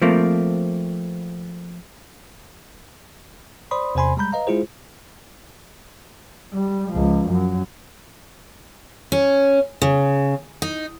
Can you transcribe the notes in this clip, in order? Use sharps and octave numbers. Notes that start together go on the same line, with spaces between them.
F3 A3 A#3 C4
C5 D5 B5 C6 D#6
E2 C3 C5 G#5 B5 C6
G3 G#3 A#5 B5 G6
B4 D#5 F5 A#5
G#3 E4 F4 G#4 C5
G3
C#2 F3
F#2
C#4
C#3
D#4